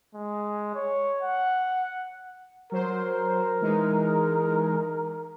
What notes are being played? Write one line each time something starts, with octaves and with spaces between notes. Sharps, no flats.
G#3
C#5
F#5
F#3 A#4 C5
E3 G#3 D#4